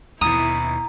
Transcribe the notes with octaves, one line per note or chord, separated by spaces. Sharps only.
D#2 B2 E4 A#5 D#6